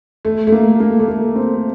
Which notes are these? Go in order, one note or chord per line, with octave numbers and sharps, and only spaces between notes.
A3
A3
A#3
A#3
A3
A#3
C4